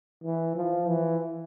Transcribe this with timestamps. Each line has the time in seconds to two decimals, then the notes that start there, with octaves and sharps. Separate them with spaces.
0.24 E3
0.56 F3
0.88 E3